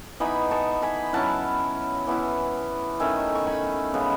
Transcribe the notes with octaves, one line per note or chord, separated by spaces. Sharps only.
E3 B3 D#4 G#5 B5
A5 C#6
G#5 B5
F#3 C#4 E4 F#5 A5
E3 B3 E4
D#3 A3 C#4 E5 G#5
C#6
G#5 B5
C#3 G#3 B3